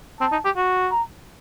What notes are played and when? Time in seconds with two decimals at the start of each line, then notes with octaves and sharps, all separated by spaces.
0.20 C4 A5
0.32 D#4
0.45 G4
0.56 F#4
0.92 A#5